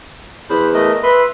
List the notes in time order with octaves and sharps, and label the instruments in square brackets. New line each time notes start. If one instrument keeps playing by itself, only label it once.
[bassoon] E2 [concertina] C5 B5
[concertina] A3 A#4 D#5
[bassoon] B4 [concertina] E5 C6